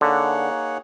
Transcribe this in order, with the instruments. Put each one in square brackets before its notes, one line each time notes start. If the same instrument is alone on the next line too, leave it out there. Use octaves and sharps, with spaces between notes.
[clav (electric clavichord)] D3 [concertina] A#3 D#4 G#4 C#5 F#5